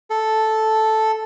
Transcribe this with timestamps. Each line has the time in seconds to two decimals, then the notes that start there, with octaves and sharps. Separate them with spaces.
0.10 A4